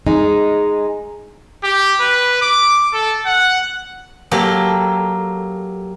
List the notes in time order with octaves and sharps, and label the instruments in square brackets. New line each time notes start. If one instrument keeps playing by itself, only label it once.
[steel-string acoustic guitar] G#3 D#4
[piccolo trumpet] G4
B4
D6
A4
F#5
[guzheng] F#3 A#3 G4 A4